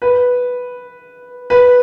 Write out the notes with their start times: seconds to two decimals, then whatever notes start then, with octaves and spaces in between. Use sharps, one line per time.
0.02 B4
1.50 B4